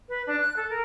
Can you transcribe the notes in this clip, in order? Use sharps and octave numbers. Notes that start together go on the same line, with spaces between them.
B4
D4
F#6
A4
A#4